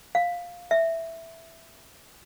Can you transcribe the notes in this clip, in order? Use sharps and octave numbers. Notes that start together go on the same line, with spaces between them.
F5
E5